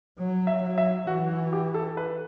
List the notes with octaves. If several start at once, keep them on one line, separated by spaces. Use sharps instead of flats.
F#3
E5
F#3
E5
E3 F#4
F#4
G4
A4
B4